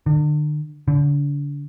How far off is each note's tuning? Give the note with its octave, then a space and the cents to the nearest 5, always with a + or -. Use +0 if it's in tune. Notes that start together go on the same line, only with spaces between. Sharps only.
D3 +40
D3 -35